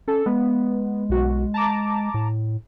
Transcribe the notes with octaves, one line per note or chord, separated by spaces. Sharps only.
C#4 A4
G#3 B3
B1 F#4
A5 A#5 D6
A2